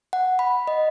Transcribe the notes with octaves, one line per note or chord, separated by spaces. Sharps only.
F#5
B5
D#5